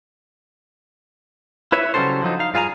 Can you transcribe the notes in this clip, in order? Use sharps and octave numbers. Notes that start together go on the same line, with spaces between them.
E4 B4 C#5 E5
C#3 F#3 G3 C#4 A4 C5
D3 F3 F#3 D#4
D#4 F5
G2 F4 G#4 F5 G#5 A#5